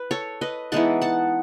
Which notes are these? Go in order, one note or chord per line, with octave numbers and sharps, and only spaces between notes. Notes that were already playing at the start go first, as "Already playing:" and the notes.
Already playing: B4
A4 C#5
B4 D#5
E3 G#3 B3 D#4 F#5 A5
F#5 A5